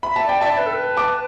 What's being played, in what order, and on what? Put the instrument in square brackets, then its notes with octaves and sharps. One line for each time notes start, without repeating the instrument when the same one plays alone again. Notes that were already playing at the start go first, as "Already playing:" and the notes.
[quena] E5 [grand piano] B5
[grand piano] A5
[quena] D5 [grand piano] G5
[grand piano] E5 A5
[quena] D5
B4
A4
B4
[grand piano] A5 D6